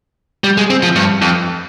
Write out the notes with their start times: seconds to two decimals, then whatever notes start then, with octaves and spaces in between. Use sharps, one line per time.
0.44 G3
0.57 G#3
0.70 C4
0.83 F3
0.96 G2
1.22 F2